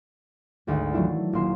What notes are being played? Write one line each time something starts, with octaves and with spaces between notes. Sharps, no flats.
G#1 D2 D#3 G#4 F#5
E3 F#3 A3 D4 E4 F4
D#1 B1 A#3 C6 E7